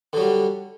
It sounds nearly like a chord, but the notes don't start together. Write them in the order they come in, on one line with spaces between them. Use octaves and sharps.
D3 F#3 G3